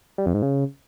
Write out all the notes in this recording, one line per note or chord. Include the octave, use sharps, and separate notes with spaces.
G3
F2
G#2
C#3